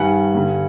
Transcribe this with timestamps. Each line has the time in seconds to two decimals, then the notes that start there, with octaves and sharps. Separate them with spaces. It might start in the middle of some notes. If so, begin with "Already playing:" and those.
Already playing: G2 D#3 G3 F#5 G#5
0.35 G2 D3 G3